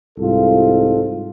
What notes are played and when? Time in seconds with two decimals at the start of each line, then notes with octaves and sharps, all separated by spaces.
0.19 C2 G#2 F4 A4